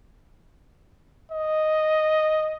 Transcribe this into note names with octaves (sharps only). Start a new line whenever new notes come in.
D#5